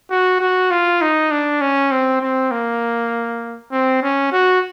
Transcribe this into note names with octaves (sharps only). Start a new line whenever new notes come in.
F#4
F#4
F4
D#4
D4
C#4
C4
C4
A#3
C4
C#4
F#4